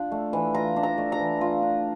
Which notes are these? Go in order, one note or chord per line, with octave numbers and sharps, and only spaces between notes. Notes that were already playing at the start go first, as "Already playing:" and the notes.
Already playing: D4 F4
A3
E3
F4 A#5
D4
A#5
A3
A#5
E3
F4
D4